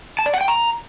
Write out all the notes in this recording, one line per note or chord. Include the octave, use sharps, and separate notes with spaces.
A5
D5
F#5
G5
A#5